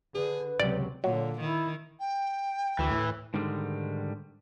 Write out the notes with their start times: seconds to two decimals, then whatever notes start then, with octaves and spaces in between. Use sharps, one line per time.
0.15 D3 G#4 B4
0.60 C#2 C3 F#3 G4 D5
1.04 A#2 D3 F#3
1.40 D#3 E4
1.99 G5
2.79 D2 E3
2.91 A2
3.34 G#2 D3 D#3 G3 G#3